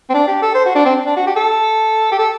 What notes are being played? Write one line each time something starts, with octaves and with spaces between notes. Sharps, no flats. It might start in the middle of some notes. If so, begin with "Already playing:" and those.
C4
D4
G4
A4
C5
F#4
D4
C4
D4
F#4
G4
A4
G4
A4